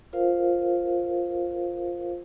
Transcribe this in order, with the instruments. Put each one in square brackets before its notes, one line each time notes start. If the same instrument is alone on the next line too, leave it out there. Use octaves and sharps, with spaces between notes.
[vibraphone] F4 A#4 C5 F5